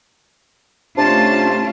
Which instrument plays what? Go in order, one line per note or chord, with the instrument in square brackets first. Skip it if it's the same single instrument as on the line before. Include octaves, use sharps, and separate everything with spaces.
[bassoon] C3 [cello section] A3 C#4 F4 [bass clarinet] D4 [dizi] A5